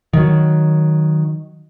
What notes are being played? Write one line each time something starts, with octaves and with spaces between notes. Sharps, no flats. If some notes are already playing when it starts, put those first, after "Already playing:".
D#3 F#3